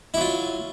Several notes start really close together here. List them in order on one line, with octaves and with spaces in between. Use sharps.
E4 F#3 F4